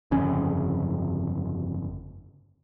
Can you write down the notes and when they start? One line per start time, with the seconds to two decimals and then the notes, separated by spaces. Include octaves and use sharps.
0.11 G1 F2 C#3 C#4